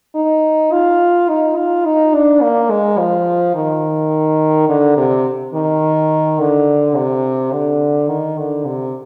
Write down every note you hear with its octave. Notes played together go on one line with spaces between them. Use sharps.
D#4
F4
D#4
F4
D#4
D4
A#3
G#3
F3
D#3
D3
C3
D#3
D3
C3
D3
D#3
D3
C3